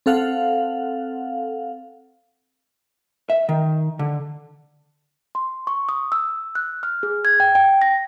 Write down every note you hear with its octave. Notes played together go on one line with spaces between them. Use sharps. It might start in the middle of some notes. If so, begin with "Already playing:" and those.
C4 A4 F5 F#5
E5
D#3
D3
C6
C#6
D#6
E6
F#6
F6
G#4
G#6
G5
G5
A#6